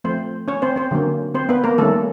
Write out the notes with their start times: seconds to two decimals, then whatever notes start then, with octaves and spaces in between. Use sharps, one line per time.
0.04 F3 A3 C4 C5
0.48 C#4 C#5
0.62 C4 C5
0.76 C4 C5
0.91 D3 F#3 A#3 C#4
1.35 C4 C5
1.49 B3 B4
1.64 A#3 A#4
1.78 D#3 G3 A3 A#3 C#4 A4